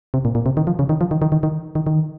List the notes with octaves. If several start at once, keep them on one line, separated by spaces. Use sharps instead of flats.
C3
A#2
A#2
C3
D#3
F3
C#3
D#3
F3
D#3
D#3
D#3
D#3
D#3
D#3